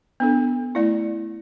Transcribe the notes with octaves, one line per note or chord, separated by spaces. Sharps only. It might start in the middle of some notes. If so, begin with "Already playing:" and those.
B3 D4 A4
A3 E4 D5